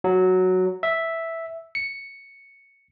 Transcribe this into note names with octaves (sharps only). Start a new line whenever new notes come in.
F#3
E5
C#7